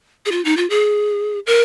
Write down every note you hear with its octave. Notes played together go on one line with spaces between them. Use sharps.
G#4
F4
D#4
F4
G#4
A#4